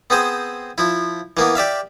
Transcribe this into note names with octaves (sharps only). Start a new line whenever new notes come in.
B3 C4 G#4 C5
F3 E4
E3 A#3 B3
G4 D5 E5 F5